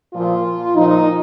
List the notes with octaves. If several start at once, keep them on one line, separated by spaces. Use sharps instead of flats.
A#2 F3 F4
A#2 F3 D#4